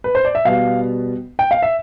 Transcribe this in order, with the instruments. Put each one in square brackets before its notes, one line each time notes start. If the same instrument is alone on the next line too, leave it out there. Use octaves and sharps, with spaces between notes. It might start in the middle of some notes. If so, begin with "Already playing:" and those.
[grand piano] B4
C5
D5
E5
B2 G3 B3 F5
G5
F5
E5